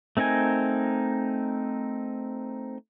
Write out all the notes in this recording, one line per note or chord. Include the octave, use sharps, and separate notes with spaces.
A3 C4 D#4 A#4 G#5